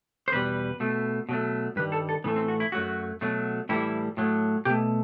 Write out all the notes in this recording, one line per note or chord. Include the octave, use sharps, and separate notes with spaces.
C5
E2 B2 G3 B4
B2 A3
B2 F#3 A3
G2 D#3 G3 B4
A4
A4
A2 E3 A3 B3
C4
F#4
E4
F#2 F#3 A3 F#4
B2 F#3 A3
A2 E3 G3 E4
A2 F#3 A3
B2 A3 G4